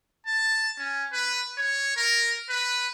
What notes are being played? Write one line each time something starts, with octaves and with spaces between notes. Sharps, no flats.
A5
C#4
B4
C#5
A#4
B4